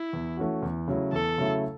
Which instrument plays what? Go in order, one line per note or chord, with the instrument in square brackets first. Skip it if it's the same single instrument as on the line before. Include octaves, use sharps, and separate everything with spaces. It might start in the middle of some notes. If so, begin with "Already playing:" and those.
Already playing: [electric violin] E4
[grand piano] E2
E3 A3 C#4 F#4
E2
C#3 F#3 A3 E4
[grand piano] E2 [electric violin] A4
[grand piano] C#3 F#3 A3 E4